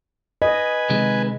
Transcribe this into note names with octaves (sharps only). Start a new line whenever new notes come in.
B4 D#5 G#5
C3 D#3 G#3